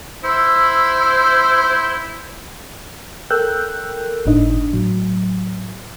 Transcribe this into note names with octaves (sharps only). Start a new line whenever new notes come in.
E4 C5 E6
A4 A#4 G5 E6 F#6 G6
G1 A2 D4 D#4 D#5
A2 F#3